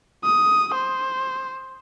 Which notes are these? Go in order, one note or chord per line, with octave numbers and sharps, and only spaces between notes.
D#6
C5